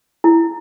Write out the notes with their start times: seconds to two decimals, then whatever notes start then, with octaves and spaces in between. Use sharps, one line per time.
0.24 E4